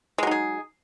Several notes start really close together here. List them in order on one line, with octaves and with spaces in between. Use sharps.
G#3 F#3 D#4 G#4